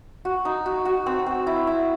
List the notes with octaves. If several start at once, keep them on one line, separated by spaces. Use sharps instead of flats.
F#4
D#4
F#4
F#4
C4
C4
E4
E4